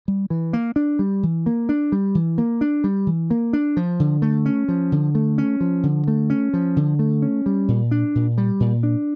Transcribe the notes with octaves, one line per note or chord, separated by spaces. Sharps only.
G3
E3
A#3
D4
G3
E3
A#3
D4
G3
E3
A#3
D4
G3
E3
A#3
D4
F3
D3
A3
C#4
F3
D3
A3
C#4
F3
D3
A3
C#4
F3
D3
A3
C#4
G3
A#2
D4
A#2
G3
A#2
D4